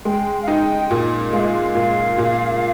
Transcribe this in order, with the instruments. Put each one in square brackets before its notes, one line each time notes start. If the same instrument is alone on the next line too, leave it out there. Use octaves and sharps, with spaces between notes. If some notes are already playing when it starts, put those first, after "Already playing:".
[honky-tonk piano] G#3 [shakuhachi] G5
[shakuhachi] F5
[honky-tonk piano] D#4 [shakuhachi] G5
[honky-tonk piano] A#2
[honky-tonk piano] G#3 [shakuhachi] F5
[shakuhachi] D#5
F5
[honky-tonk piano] A#2
A#2